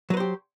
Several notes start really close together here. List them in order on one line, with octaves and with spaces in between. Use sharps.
F#3 B4 C5 G4